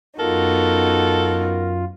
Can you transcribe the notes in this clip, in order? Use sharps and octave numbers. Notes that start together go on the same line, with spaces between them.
F#2 B3 D#4 F4 F#4 A4 A#4